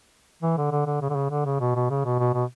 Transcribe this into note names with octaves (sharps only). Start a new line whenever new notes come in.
E3
D3
D3
D3
C#3
D3
C#3
D3
C#3
B2
B2
C#3
B2
B2
B2